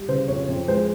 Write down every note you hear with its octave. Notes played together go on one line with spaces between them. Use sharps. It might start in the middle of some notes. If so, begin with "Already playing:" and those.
Already playing: G3
C#3 C5
F2 C#5
F2
G#3 C5